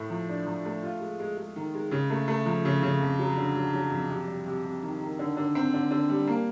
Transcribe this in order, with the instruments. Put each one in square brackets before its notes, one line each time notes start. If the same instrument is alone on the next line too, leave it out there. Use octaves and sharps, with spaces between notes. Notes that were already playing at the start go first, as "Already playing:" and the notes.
Already playing: [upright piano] A2 A3
F3
D4
F3
A3
F4
G#3
G#3
G#3
D#3
G#3
C#3
A3
A3
F3
C#3
C#3
F2
F#3
D3
F#3
F#3
F2
C3
G3
C3
C3
D#3
D#3
D3
D3
C4
D3
D3
G3
A#3